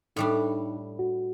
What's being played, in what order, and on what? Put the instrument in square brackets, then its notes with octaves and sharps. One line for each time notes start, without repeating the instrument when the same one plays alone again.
[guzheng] A2 G3 D4 [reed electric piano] D#4
[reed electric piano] F#4